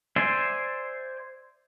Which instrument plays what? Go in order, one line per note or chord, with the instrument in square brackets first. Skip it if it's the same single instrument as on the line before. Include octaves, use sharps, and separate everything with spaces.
[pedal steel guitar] C5 D5 E5 G#5 C6